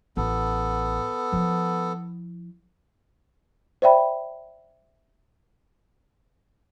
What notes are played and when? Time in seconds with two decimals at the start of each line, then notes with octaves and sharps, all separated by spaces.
0.17 A1 B3 A4
1.32 F3 E4
3.82 C5 D5 E5 G5 B5